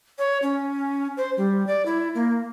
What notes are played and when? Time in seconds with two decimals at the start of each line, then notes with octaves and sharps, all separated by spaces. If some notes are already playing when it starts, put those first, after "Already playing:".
0.19 C#5
0.43 C#4
1.17 C5
1.37 G3
1.67 D5
1.86 E4
2.15 A#3